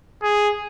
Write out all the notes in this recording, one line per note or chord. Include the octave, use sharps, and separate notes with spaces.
G#4